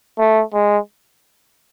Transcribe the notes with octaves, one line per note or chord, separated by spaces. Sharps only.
A3
G#3